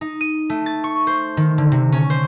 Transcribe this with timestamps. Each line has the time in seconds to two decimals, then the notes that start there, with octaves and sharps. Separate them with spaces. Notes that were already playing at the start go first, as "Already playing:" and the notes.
0.01 D#4
0.21 D#7
0.49 A3
0.66 A6
0.84 C#6
1.07 C5
1.37 D#3
1.58 D3
1.72 C3
1.92 C#4
2.10 C5